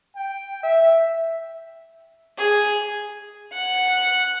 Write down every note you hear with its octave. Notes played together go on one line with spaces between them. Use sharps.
G5
E5
G#4
F#5